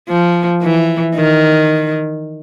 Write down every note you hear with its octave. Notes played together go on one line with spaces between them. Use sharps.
F3
E3
D#3